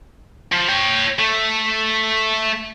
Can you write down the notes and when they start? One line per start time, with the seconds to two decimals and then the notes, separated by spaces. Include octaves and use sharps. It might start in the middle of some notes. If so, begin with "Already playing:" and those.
0.52 F3
0.69 C#5 G5
1.19 A3